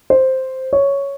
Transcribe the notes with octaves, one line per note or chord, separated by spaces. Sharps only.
C5
C#5